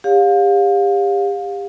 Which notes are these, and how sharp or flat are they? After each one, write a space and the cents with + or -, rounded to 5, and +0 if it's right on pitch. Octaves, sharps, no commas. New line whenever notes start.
G4 +30 C#5 +25 F5 +25